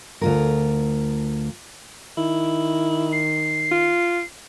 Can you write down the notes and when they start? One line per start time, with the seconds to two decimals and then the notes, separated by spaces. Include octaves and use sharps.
0.21 D2 F4 A#4
2.17 D#3 E4
3.12 C7
3.71 F4